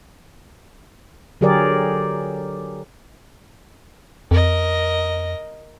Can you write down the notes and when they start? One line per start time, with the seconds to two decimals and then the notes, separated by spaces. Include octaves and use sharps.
1.41 D3 F#3 G4 G#4 A#4 D5
4.31 F2 A#4 D#5